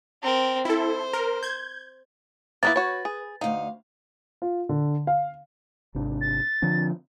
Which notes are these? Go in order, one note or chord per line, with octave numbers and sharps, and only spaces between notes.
C4 A#4
E4 A4 C5
A#4
G6 G#6
A#3 B3 E4 B4 A6
F#4 C#5
G#4
D2 D#4 F5
F4
D3
F5
G#1 C3 D4
A6
D3 F3 C4